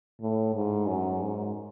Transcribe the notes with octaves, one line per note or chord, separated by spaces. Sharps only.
A2
G#2
F#2
G#2